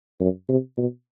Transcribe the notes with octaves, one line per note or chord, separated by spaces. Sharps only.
F#2
C3
B2